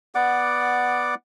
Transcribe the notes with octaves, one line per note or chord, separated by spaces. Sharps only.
B3 D5 F#5 D6